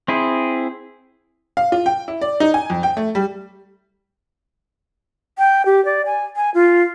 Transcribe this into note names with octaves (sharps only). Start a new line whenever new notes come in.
C4 E4 G#4
F5
F4
G5
E4
D5
D#4
G#5
F2
G5
A3
G3
G5
G4
D5
G#5
G#5
F4